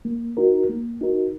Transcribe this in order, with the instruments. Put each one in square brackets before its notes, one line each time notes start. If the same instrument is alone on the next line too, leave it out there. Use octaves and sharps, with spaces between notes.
[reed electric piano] A#3
D#4 F#4 A#4
A#3
D#4 F#4 A#4